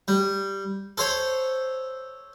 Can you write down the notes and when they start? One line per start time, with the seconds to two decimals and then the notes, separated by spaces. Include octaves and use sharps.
0.08 G3
0.98 A4 C5 C#5